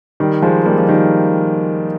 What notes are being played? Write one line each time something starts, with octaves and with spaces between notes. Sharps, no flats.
D#3 G3
F3 G#3
G3 A#3
F3
D#3 G3